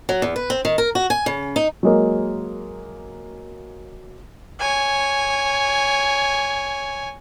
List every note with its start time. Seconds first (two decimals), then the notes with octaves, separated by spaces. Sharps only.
0.09 F#3
0.22 E2
0.36 B4
0.50 C4
0.65 D#3
0.78 A#4
0.95 F#4
1.10 G#5
1.26 C#3
1.56 D#4
1.83 F#3 G#3 A#3
4.60 C#5 G#5